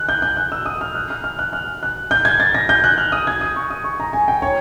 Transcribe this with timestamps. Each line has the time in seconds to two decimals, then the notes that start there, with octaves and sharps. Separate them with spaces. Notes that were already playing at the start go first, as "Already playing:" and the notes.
Already playing: F#6
0.09 G6
0.22 G6
0.37 F#6
0.52 E6
0.66 D#6
0.81 F6
0.95 F#6
1.10 F6
1.24 F6
1.39 F#6
1.53 F6
1.83 F#6
2.11 G6
2.25 G#6
2.40 A6
2.55 A#6
2.69 G6
2.84 F#6
2.98 F6
3.12 D#6
3.27 G#6
3.41 D#6
3.56 C#6
3.70 D#6
3.84 C#6
4.00 A#5
4.13 G#5
4.28 G5
4.42 C#5